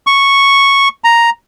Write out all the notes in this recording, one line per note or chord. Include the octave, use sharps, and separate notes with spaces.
C#6
A#5